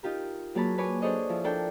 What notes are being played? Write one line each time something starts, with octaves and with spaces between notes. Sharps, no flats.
D#4 F4 G4 A#4
F#3 A#3 G#4 C#5 A5 B5
B4 C#5 G#5 D6
D4 G#4 A4 C5 C#5 D#5
F3 E4
D4 A4 A#4 G5